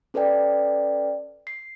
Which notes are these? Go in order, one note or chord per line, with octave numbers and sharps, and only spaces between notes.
C#4 A4 B4 D5 G5
C7